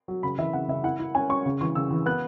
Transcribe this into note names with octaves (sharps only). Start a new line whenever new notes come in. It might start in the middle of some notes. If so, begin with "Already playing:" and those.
F#3
C#3 B5
E3 E5
C#3 F#5
C#3 E5
E4 F#5
E4
C#4 G#5
C#4 C#6
C#3
E3 C#6
C#3 E6
E3
B3 F#6